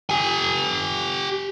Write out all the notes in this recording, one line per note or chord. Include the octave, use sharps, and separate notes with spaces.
G4 G#5